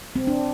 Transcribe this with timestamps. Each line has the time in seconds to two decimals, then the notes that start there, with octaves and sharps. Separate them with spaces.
0.16 C4
0.27 D4